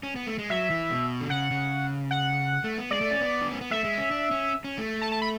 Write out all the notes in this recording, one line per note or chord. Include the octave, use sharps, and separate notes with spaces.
C#4
B3
A3
G#3
F#3 E5
E3
B2
D3
C#3 F#5
C#3
F#5
A3
B3
G#3 D5
A3
C#4
B3
D4
C#4
B3
A3 E5
G#3
C#4
D4
C#4
C#4
A3
A5
A5
B5